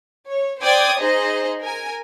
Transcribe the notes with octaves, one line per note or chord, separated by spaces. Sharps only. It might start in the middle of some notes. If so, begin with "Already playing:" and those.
C#5
C5 D5 G5 D6 D#6 G#6
D#4 G#4 C5 D#5
A#4 G#5